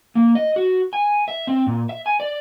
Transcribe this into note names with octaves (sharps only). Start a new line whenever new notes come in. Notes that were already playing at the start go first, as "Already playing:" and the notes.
A#3
D#5
F#4
G#5
E5
C4
A#2
E5
G#5
D5